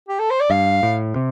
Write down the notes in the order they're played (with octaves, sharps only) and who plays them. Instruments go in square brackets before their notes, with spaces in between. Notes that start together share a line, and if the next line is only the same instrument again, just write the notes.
[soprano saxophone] G4
A4
C5
D5
[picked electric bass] G2 [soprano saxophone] F5
[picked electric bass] A2
C3